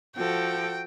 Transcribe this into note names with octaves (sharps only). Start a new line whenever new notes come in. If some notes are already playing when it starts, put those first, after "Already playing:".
F3 F#4 A4 G5